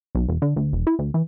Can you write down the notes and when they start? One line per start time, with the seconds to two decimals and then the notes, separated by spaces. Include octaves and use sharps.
0.15 B1
0.28 E1
0.42 D3
0.56 D2
0.73 E1
0.87 E4
0.99 D2
1.14 E3